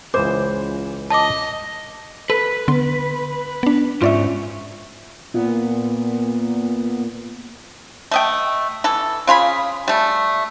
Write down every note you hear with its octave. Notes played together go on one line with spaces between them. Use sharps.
C#2 E3 G#3 C5 D6
D#5 A5 D6
A4 B4
D3 B3 C6
B3 D4
G#2 C#4 F4 D5 E5
A#2 B3
A3 D#5 G5
E3 A4
C#3 F4 G#4 B5
G3 A3